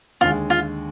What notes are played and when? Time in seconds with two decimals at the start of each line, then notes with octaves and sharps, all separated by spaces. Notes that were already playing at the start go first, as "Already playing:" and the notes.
0.21 D#2 D3 G#3 F4
0.50 F4